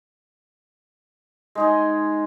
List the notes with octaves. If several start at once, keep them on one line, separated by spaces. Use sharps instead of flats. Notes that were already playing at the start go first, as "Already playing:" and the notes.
G#3 D#4 G#4